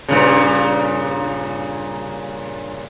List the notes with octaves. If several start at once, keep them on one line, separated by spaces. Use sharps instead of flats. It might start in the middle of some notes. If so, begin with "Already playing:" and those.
G2 A#2 C#3